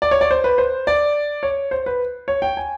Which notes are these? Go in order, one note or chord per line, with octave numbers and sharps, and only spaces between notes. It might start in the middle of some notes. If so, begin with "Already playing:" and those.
D5
C#5
D5
C5
B4
C5
D5
C#5
C5
B4
C#5
G5
G#5